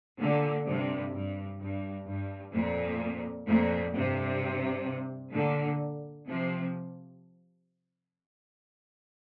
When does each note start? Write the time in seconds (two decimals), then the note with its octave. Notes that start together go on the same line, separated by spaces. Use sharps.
0.19 A#2 D3
0.66 G2 C3
1.13 G2
1.60 G2
2.07 G2
2.53 F2 A#2
3.46 F2 A#2
3.94 G2 C3
5.34 A#2 D3
6.27 C3 F3